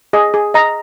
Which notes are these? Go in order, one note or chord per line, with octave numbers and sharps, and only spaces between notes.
G#4 D#5
G#4
D#5 A#5